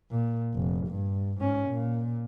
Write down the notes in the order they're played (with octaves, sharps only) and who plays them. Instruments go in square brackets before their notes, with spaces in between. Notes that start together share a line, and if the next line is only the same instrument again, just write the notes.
[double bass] A#2
F1
G2
G#2 C#4
A#2